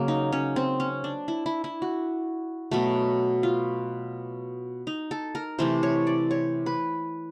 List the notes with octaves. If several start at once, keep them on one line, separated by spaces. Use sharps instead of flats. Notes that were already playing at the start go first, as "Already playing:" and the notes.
Already playing: C#3 F#3 A#3
D#4
C#4
C4
C#4
D4
E4
E4
E4
F#4
B2 F#3 A3
F4
D#4
A4
A#4
C3 E3 A3 C5
C#5
D5
C#5
B4